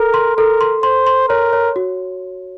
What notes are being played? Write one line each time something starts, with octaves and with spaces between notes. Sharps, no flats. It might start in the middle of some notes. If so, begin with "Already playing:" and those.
Already playing: A4 A#4
C6
A4 A#4
C6
C5 C6
C6
A#4 C#5
C#5
F#4